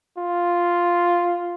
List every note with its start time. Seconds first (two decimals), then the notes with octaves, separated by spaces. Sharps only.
0.18 F4